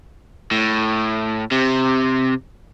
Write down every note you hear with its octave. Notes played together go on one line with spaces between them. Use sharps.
A2
C3